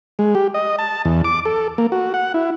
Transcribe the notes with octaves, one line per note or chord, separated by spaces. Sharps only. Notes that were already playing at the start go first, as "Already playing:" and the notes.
G#3
G4
D#5
A5
E2
D6
A4
A#3
F#4
F#5
E4